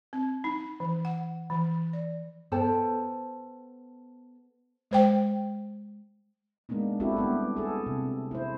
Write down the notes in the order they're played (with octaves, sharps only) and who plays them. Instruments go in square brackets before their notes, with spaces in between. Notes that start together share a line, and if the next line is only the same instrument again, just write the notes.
[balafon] C4
D#4
E3
F#5
E3
D5
[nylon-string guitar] B3 A4 C5 G5 A5
[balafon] G#3 C5 G5
[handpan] G#3 A#3 B3 D4 D#4
C4 D4 E4 F#4 G4 A4
G3 B3 G4
G#4 A4
C3
E4 C5